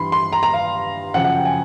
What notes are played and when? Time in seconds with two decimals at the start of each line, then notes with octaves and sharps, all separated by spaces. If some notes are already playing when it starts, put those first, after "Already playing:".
Already playing: G2 E3 B5 C6
0.12 C6
0.32 A#5
0.43 A#5
0.53 F5
1.14 F#2 C#3 F3 F#5
1.25 F#5
1.35 G5
1.45 G#5